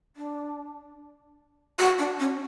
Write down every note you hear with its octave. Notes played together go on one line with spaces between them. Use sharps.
D4
F#4
D4
C#4